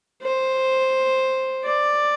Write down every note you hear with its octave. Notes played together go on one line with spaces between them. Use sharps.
C5
D5